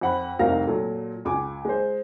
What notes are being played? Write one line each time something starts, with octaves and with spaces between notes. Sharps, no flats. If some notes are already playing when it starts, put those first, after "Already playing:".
F2 F#5 B5
F1 C2 D#4 A#4 F5 A#6
A#2 F#3 A4
C#2 G#5 D6
G#3 C5